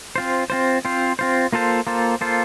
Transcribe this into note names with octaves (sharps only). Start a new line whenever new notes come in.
C4 F4 C5
C4 F4 C5
C4 F4 C5
C4 F4 C5
A#3 F4 A4 C5
A#3 F4 A4 C5
A#3 F4 A4 C5